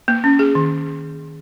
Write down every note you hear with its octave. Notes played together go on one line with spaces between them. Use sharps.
A#3
C#4
G#4
D#3